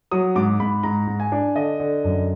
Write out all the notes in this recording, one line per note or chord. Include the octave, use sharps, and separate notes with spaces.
F#3 D#6
G#2 D6
G#2 B5
G#2 A#5
G#2
G#5
D4
D3 D#5
D3
F#2